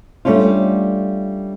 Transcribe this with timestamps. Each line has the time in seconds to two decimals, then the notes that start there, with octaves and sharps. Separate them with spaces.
0.25 G3 A3 C#4 D4 F4